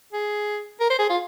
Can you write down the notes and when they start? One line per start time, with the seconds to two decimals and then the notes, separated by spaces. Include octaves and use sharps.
0.13 G#4
0.80 A#4
0.90 C5
0.99 G#4
1.10 F4